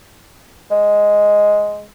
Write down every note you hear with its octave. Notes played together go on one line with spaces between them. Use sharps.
G#3